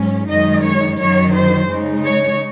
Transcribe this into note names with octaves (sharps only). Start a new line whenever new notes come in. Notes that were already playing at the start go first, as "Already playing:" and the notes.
Already playing: G#2 F#3 C#4
F#2 D#3 G#3 D#4 D#5
C#5
F#2 D#3 F#3 C#5
C5
C#3 G#3 D#4
C#5